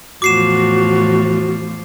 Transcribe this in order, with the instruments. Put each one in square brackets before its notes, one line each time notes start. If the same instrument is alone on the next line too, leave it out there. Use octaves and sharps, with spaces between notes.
[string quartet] E2 A2 F3 [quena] F#4 [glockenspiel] D6 C7 E7